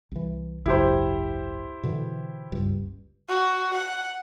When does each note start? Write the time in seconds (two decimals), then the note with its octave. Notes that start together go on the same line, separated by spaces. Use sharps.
0.12 C2 E3
0.66 G#1 C#2 F#2 E4 G4 C5
1.83 B2 D3 E3
2.52 F#1 C#2 G2
3.29 F#4
3.74 F#5